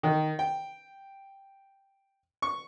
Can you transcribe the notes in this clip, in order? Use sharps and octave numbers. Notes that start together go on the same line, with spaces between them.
D#3
G5
C#6